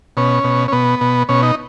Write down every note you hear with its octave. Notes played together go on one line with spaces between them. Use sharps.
B2 C#4
B2
C#4
B2 B3
B2
B2 C#4
D#4